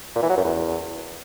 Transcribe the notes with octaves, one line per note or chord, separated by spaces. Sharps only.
A#2
E3
F#3
F#2
E2